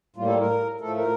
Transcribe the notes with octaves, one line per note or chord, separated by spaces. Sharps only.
A2 G3 A#3 F4
A4
A#4
A2 F3 A3 A4
A#4